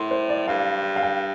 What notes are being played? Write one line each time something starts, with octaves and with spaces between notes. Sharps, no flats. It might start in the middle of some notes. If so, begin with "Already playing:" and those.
Already playing: A2 C6
C5
D5
G2 F5
F5
G5